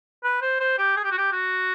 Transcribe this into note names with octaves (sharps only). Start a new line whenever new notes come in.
B4
C5
C5
G4
G#4
G4
F#4
G4
F#4